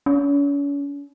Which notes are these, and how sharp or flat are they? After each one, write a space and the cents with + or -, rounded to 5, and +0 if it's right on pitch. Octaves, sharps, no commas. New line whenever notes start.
C#4 +40